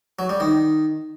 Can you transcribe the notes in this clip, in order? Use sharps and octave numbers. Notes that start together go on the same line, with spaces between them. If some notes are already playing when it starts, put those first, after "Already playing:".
F#3
G3
D#3